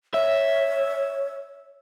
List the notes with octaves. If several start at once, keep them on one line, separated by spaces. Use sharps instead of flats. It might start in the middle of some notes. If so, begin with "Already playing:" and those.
C#5 E5